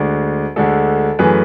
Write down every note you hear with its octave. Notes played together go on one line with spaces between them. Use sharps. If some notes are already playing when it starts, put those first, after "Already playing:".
Already playing: D2 D3 G#3
D2 D3 G#3 A4
F#2 E3 A3 G#4 B4